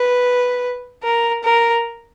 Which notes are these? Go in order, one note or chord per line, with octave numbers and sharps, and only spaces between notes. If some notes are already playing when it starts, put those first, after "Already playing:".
Already playing: B4
A#4
A#4